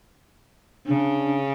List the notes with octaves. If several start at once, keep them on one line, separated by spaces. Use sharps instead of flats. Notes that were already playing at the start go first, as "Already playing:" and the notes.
C#3 D4